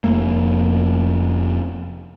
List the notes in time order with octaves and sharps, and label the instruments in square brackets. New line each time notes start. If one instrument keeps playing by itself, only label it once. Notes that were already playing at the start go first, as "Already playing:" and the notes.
[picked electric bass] F1 F2 A3 A#3